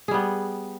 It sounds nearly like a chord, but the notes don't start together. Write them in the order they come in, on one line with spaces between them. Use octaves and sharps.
G#4 G3 B3